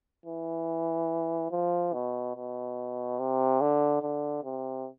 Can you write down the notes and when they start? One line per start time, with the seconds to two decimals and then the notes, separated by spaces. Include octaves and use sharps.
0.26 E3
1.51 F3
1.93 B2
2.36 B2
3.19 C3
3.61 D3
4.02 D3
4.44 C3